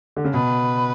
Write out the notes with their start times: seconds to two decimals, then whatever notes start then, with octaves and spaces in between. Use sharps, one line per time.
0.16 D3
0.24 C#3
0.34 B2 B4